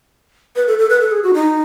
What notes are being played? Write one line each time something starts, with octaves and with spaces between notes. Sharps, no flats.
B4
A4
A4
B4
A4
G#4
F#4
D#4